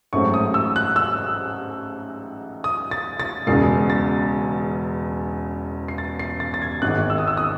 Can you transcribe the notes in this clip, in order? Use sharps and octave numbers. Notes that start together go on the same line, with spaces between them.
A1 G#2 F#3 A3 C4 C#6
D#6
E6
F#6
E6
D#6
A6
A6
E1 E2 C#3 C7
A6
C7
A6
C7
A6
A6
G#6
G#1 G#2 D#3 F#6
E6
D#6
E6
D#6